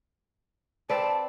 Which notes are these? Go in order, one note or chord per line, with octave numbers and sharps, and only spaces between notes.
C4 B4 D5 A5